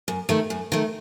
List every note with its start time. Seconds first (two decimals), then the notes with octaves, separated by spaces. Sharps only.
0.08 F#2
0.29 D#3 A3
0.50 F#2
0.72 D#3 A3